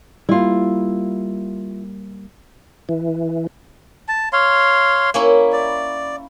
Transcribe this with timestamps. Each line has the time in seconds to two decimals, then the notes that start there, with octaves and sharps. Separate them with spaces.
0.29 G3 A#3 E4 F4
2.89 E3
4.08 A5
4.33 C#5 F5 C6
5.14 A#3 C#4 E4
5.52 D5